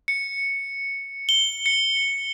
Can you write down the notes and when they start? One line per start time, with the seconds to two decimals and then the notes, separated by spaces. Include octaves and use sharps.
0.08 C#7
1.29 G7
1.66 C#7